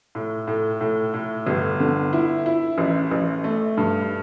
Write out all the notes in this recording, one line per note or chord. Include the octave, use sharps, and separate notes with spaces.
A2
A2
A2
A2
G1
D3
E4
E4
A1
A1
A3
G2